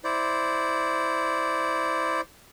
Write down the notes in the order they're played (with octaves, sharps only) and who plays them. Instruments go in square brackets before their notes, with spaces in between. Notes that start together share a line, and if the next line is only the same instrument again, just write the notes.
[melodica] E4 C5 D5